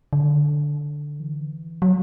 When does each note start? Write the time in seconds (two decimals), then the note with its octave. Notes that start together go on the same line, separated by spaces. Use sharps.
0.13 D3
1.20 E3
1.82 F#3